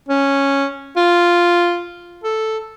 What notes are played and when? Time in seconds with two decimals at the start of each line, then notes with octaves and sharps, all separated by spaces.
0.08 C#4
0.97 F4
2.24 A4